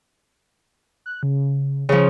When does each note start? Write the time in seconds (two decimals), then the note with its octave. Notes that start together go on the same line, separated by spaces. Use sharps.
1.06 F#6
1.23 C#3
1.89 C#3 F3 C#4